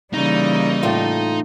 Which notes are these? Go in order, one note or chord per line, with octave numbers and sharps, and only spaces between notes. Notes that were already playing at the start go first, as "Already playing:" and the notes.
C#3 E3 G3 A#3 D#4
A2 A3 F4